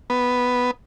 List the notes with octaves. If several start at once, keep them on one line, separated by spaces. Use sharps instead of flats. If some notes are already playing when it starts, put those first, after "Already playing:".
B3